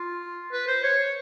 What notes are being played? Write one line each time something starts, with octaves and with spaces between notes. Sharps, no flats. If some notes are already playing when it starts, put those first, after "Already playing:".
Already playing: F4
B4
C5
C#5